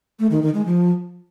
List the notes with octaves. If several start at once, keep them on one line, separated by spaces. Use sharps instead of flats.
A3
D#3
D#3
G#3
F3